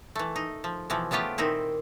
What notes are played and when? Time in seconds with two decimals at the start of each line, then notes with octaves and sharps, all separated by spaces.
0.15 E3 A3
0.36 D#4
0.64 F3
0.90 B2 E3 F3
1.11 C#3 A3 B3 F4 G4
1.38 A#2 D#3 C4 D#4 E4